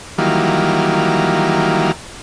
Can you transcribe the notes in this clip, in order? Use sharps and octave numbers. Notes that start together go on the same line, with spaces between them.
D#3 E3 F#3 G3 A#3 F4